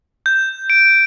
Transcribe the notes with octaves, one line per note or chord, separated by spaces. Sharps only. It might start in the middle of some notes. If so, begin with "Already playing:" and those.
G6
D7